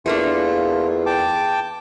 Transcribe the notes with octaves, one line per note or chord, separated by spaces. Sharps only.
E2 A3 A#3 D4 F4
G5 A5 D6